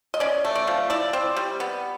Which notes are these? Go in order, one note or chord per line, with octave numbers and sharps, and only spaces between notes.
D#5
C#4 D5
A3
D5
F3
E4 D5
C4
G3
B3